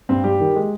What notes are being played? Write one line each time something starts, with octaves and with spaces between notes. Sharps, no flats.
G2 C4
G3 G4
D#3
G#3